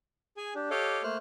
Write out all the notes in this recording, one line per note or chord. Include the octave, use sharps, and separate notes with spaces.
G#4 G#5
D4 G4
G4 A4 C#5 D#5 F5 D6
A3 A#3 C5 F6 F#6